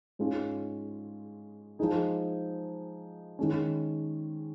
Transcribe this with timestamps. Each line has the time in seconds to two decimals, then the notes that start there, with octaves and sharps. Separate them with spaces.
0.19 G#2 G#3 C#4 F4
1.79 F3 G#3 D#4 G#4
3.39 D#3 G#3 C#4